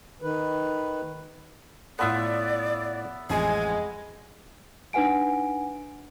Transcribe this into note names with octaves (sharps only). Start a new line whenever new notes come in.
D#3 B4
A2 B3 F4 A4 D5 E5
A1 F2 G#3 G#5
D4 D#4 B4 F#5 G#5 D7